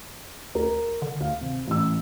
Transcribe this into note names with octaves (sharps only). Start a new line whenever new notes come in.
D2 A#4
D3
D2 F5
C3
A1 E6